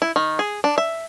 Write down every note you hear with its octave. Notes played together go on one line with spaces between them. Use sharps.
E4
D#3
G#4
D4
E5